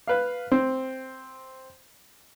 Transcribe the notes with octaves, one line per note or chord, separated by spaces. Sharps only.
B4 F5
C4